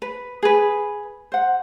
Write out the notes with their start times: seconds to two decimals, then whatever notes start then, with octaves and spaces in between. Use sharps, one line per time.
0.02 B4
0.43 G#4 B4
1.32 C5 F#5